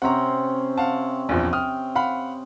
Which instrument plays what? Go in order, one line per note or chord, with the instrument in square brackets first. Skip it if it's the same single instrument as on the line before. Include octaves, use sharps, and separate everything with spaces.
[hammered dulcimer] C3 C4 C#4 [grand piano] F#5 A#5
[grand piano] F5 F#5 A5
A#1 E2 F3
[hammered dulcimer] G5 [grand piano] D#6 F6
[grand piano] F5 F#5 B5